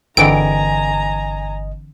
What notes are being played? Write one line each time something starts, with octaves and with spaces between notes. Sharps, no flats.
G1 D3 E3 C4 D#5 G#5 A#5 D7